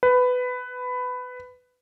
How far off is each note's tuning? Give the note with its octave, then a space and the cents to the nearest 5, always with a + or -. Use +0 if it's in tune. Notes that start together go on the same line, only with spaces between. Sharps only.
B4 +15